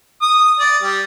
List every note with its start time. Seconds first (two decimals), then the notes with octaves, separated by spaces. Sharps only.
0.22 D#6
0.60 D5
0.83 G3